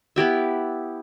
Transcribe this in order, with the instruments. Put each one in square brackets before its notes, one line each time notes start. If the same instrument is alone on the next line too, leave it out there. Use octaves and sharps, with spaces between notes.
[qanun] B3 E4 G4 E5